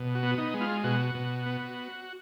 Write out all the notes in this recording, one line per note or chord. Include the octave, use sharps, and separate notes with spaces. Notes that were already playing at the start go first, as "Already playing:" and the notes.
Already playing: B2
F#4
B3
D#4
G#3
F4
B2 F#4
B2
B3